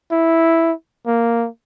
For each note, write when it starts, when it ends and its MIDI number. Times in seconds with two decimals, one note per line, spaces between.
0.11 0.73 64
1.06 1.48 58